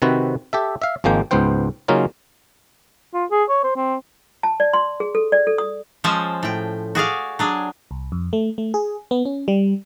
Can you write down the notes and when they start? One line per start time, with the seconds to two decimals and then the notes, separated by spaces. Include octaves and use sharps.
0.02 C3 D#3 C4 F#4 B4
0.53 G4 A4 E5
0.82 E5 F5
1.04 G#1 F3 G#3 A#3 G5
1.31 C#2 G#2 B3 C5 G5
1.88 C#3 F#3 A#3 C#4 D#4 F4
3.14 F4
3.31 G#4
3.49 C#5
3.64 C5
3.76 C4
4.43 A5
4.60 D5
4.73 C6
5.00 G#4
5.15 A4
5.32 D5
5.47 A4
5.58 D#6
6.04 F3 G#3 C#4 C5 G#5 A5
6.43 A2 G5
6.95 F#4 G#4 D5 F5
7.39 F#3 D4 G#4
7.91 C2
8.12 F2
8.33 A3
8.58 A3
8.74 G#4
9.11 B3
9.25 C#4
9.48 G3